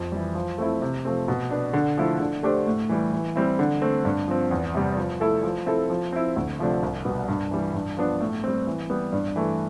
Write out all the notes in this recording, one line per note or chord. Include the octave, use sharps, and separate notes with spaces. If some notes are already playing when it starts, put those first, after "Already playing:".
Already playing: F2
E3 G3
F3
A3 C4 E4
C3
F3 A3 C4
B2
B3 D4
D3
F3 A3 E4
D3
A3 D4 G4 C5
A2
E3 G3
E3
G3 C4 E4
D3
A3 C4
G2
F3 C4
E2
C3 G3
F3
A3 E4 A4
F3
C4 E4 A4
F3
C4 E4
D2
C3 F3 A3 D4
C2
B2 G3 B3
G2
E3 G3
G2
F3 B3 D4
A2
G3 C4
E3
G3 B3
G2
E3 A3